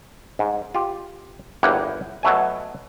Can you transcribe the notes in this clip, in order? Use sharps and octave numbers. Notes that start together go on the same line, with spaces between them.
G#2
F4 G4
G1 E2 A#3 E4 F#5 G5
B2 F#3 A3 G#5